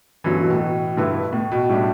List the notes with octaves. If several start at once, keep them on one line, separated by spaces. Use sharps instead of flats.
G1 G2 D3 E3 F#3 C#4
B2
A2
B2
G2 D3 A3 E4 B4
A2
B2
A2 G3 D4 G4